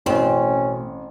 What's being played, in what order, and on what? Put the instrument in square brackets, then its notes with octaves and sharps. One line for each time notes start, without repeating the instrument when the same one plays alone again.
[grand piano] A1 [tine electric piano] B2 A3 [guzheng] C4 [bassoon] C#4